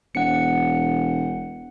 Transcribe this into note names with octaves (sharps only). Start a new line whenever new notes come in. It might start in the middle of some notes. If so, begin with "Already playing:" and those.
E1 F#5 C#7